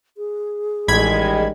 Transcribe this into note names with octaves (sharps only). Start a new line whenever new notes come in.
G#4
A1 D#3 G3 G#3 B5 G#6